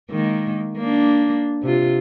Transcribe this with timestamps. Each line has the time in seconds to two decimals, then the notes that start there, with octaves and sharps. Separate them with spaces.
0.11 D#3 G#3 A#3
0.78 A#3 D4
1.63 C3 F4